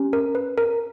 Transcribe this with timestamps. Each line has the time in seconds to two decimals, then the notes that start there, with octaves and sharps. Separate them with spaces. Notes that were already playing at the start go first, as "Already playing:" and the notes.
Already playing: C#4 G4
0.13 A#4
0.35 B4
0.58 A#4